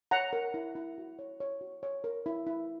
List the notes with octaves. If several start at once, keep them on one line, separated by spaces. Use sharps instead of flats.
C#5 F#5 A#5
A#4
E4
E4
F#4
C#5
C#5
F#4
C#5
A#4
E4
E4